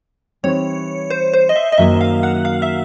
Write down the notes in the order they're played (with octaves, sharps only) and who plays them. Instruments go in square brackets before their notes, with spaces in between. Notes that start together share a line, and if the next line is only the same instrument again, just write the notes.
[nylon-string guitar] E3 G3 C4 D#4 [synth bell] C#5
[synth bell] C5
C5
D#5
E5
D#5
[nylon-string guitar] F#2 D#3 F#3 A#3 [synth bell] E5
[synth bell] F5
F#5
F5
E5